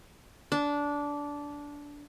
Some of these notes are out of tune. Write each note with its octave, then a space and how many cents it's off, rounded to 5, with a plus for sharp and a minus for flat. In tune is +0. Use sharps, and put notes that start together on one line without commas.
D4 -15